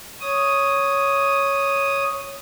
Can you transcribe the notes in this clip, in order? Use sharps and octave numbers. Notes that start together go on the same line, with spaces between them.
C#5 D#6